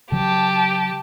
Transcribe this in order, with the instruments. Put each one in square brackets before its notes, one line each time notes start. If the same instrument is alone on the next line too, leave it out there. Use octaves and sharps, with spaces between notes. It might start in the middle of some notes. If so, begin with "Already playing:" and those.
[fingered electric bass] C#3 F#3 [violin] G4 A5